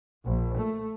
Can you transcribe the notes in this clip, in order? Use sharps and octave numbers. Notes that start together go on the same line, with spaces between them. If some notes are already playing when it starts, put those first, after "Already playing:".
A#1
A3